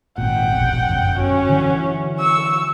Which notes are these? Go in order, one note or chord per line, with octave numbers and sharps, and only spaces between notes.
G#1 A#2 F#5 G5
E1 A#1
G1 F#2
C#4 F#4
D3 E3 F#3
C#6 E6